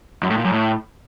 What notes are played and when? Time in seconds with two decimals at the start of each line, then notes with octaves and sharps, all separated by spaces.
0.23 F#2
0.30 A2
0.38 A#2
0.45 F#2
0.52 A2